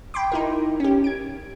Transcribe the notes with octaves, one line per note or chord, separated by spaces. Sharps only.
G5 B5 C6 D6
D#4 E4 A#4
C#4 G4
G#6 D7